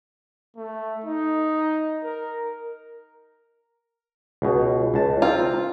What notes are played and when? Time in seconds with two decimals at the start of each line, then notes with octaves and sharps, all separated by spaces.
0.57 A3
1.04 D#4
2.04 A#4
4.42 C#2 B2
4.94 C#2 A5
5.22 C4 F4